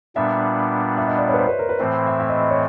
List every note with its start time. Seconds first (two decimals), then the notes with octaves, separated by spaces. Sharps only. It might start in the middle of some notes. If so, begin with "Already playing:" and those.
0.15 A#2 G3 B3 D4 E5
0.98 E5
1.07 D#5
1.18 D5
1.28 C#5
1.34 B4
1.39 C5
1.49 B4
1.59 A#4
1.69 B4
1.79 A2 E3 A3 C4 C5
2.07 E5
2.20 E5
2.29 D#5
2.41 D#5
2.50 C#5